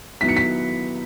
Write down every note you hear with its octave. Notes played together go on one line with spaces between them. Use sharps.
D#3 F#3 B3 E4 B6
C#7
B6